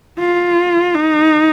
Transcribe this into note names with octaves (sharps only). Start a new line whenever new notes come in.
F4
D#4